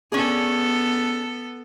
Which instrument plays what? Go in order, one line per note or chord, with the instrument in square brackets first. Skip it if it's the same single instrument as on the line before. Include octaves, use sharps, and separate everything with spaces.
[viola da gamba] B3 A4 [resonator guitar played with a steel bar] C#4 D4 G#4